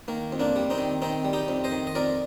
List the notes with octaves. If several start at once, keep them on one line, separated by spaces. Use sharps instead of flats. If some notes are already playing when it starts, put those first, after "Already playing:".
D#3 A#3
F2
A#3 D4
G3
C4 D#4
D#3
D#3 C4 D#4
G3
D#4 G4
F2
C5 D#5
D#3
D#5
F2 A#4 D5